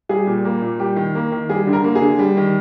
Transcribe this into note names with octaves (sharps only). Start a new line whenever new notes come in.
G3 G#4
A#2
A#3
A#2
G3 G4
D#3
A#3
D#3
G3 G#4
D3
A#4
A#3
G#4
D3
G3
D#3